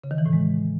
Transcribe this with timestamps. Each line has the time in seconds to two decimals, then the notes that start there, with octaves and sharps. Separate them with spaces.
0.04 C#3
0.11 D#3
0.18 E3
0.26 A2
0.33 G#3